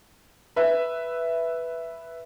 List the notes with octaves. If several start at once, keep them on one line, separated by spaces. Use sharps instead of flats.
B4 E5